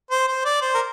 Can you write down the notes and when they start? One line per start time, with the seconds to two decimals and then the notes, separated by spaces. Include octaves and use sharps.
0.11 C5
0.28 C5
0.45 D5
0.62 C5
0.75 A#4